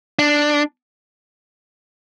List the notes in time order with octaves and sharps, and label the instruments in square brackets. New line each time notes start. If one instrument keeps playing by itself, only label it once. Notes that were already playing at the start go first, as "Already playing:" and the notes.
[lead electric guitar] D4